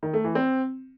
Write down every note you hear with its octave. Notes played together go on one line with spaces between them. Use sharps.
D#3
A3
E3
C4